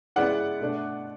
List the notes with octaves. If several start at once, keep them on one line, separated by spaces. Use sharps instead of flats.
C#3 G#3 B3 E4 D5 F#5
B2 A3 D4